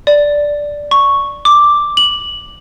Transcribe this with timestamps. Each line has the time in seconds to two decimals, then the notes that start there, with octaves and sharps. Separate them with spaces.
0.07 D5
0.91 C#6
1.45 D6
1.97 F#7